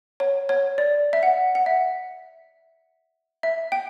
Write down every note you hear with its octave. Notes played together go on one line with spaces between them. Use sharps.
C#5
C#5
D5
E5
F#5
F#5
E5
E5
G5